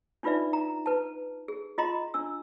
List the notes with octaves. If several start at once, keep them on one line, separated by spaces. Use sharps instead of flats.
D4 D#4 F4 B4 D5 E5
A#5
B4 A5
G#4
F4 D#5 A#5 C6
D4 E6